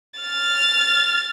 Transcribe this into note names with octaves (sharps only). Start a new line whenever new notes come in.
F6 A6